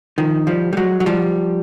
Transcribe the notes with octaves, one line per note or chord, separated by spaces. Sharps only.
D#3 F3
F3 G3
G3
F#3 G#3
F#3
F3 G3